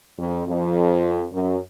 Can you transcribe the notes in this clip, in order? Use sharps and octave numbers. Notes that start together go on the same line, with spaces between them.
F2
F2
F#2